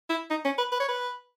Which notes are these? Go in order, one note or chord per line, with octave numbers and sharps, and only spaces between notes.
E4
D#4
C#4
B4
B4
C#5
B4